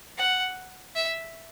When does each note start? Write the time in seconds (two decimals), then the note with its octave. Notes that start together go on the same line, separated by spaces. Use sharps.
0.18 F#5
0.96 E5